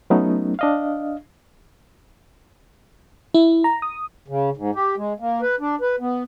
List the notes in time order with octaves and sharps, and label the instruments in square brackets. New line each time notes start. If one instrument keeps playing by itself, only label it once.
[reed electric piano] F#3 A3 B3 C#4 D#4
D4 D#5 F5
[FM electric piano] E4
A#5
D#6
[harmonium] C#3
G#2
G4
G#3
A#3
B4
D4
B4
B3